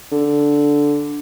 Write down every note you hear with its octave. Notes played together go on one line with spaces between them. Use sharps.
D3